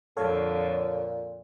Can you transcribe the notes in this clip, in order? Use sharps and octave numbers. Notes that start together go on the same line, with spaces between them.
F2 A#2 D3 A4 C#5 F5